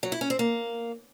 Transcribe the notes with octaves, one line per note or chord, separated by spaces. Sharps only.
F#3
E4
C#4
C4
A#3